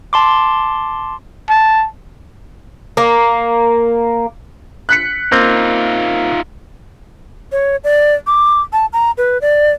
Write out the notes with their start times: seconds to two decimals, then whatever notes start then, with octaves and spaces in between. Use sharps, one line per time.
0.13 A5 C6 D6
1.49 A5
2.97 A#3
4.89 F#6 B6 C#7
5.32 A#3 C4 D#4 F4
7.52 C#5
7.84 D5
8.27 D6
8.73 A5
8.93 A#5
9.18 B4
9.41 D5